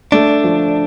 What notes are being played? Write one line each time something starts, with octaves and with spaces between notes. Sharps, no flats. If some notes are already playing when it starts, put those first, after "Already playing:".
A3 D4
F3